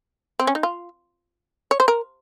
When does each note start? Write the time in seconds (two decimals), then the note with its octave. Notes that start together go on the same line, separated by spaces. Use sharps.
0.39 C4
0.47 C#4
0.55 D#4
0.63 F4
1.71 C#5
1.80 C5
1.88 A#4